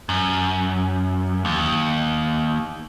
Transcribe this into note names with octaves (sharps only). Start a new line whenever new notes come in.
F#2
D#2